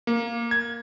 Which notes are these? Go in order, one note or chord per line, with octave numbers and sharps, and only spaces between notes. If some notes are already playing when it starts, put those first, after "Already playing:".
A#3
G#6